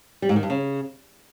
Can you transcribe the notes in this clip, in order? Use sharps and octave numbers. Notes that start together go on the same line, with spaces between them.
G3
G#2
D#3
G2
C#3